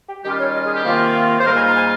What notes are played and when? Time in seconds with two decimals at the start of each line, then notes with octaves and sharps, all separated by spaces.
0.09 G4
0.23 D#3 G3 C#4 F4 G4
0.39 C#5
0.54 D#5
0.64 G#4
0.74 G4
0.84 C3 D#3 A#3 F4
1.40 C5
1.45 G#2 G3 A#3 F4 A#4
1.55 G#5
1.66 A#5
1.75 G#5